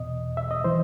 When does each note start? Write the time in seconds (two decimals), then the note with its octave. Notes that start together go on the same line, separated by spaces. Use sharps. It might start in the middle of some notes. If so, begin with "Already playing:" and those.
Already playing: E2 B2 D#5
0.37 E5
0.51 D#5
0.64 E3 C5